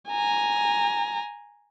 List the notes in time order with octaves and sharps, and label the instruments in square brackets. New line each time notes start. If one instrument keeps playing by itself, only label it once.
[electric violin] G#5 A#5